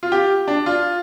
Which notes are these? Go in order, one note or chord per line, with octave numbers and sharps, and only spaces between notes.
F4
G4
D4
F4